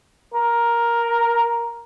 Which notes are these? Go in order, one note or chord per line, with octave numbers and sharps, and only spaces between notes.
A#4